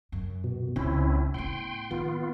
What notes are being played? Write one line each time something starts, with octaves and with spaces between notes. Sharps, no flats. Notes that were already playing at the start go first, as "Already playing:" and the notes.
F#2
B2
C#2 C4 C#4 E4
A2 B3 G5 C6
D#3 B3 F4